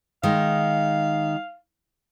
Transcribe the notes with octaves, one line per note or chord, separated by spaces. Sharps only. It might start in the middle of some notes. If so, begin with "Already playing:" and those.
D#3 G#3 F5